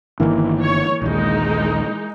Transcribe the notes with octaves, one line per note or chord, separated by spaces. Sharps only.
G1 D#3 E3 A#3
C#5
A#1 D#2 G#3 D#4